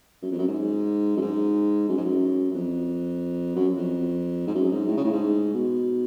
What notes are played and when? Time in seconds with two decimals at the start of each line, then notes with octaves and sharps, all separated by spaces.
0.22 F#2
0.31 F2
0.39 F#2
0.48 G#2
1.17 F#2
1.22 G#2
1.89 F#2
1.97 G#2
2.05 F#2
2.51 F#2
2.55 F2
3.56 F#2
3.77 F2
4.47 G#2
4.54 F#2
4.71 G#2
4.88 A2
4.97 C#3
5.04 A2
5.12 G#2
5.54 B2